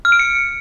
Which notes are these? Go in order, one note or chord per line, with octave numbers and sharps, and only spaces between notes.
F6
D7
C#7